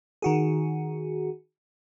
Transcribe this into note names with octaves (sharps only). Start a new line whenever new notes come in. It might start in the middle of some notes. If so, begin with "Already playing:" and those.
D#3 F#4 G#4